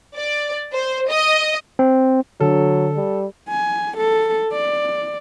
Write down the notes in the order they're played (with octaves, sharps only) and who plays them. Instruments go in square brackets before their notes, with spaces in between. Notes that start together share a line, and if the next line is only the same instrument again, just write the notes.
[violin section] D5
C5
D#5
[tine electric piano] C4
[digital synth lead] D3 [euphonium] F#3 [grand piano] A4
[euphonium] G3
[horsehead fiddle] G#5
A4
D5